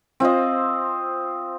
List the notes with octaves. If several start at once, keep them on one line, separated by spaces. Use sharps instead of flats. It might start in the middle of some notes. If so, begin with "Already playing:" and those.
C4 F4 C5 D#5